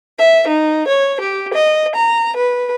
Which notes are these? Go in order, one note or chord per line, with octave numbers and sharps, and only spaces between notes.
E5
D#4
C#5
G4
D#5
A#5
B4